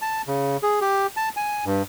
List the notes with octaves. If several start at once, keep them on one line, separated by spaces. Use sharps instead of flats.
A5
C#3
G#4
G4
A5
G#5
G2